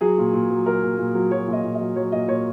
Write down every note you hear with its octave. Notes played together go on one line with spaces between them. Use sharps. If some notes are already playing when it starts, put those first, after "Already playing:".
F#3 G#4
A#2
A#2
F#3
F#3 A#4
A#2
A#2
F#3
F#3 C#5
A#2
D#5
A#2
D#5
F#3
F#3 C#5
A#2 D#5
A#2 C#5